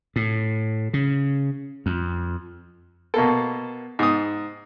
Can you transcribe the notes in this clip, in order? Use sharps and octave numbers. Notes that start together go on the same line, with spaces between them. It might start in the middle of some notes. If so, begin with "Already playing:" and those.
A2
C#3
F2
B2 A#3 A4
G#2 D#6